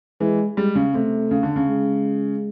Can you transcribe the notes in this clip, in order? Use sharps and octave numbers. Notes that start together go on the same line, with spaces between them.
E3 G#3
G3 G#3
C#3
C3 A3
C#3
D3
C#3
G#3